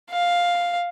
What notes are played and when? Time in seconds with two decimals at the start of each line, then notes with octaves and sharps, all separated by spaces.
0.11 F5